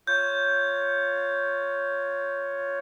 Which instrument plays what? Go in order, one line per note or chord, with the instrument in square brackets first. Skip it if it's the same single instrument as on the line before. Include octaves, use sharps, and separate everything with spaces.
[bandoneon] F4 C#5 [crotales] G6